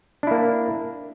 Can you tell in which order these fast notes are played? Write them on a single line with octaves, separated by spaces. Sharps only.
D4 E4 A#3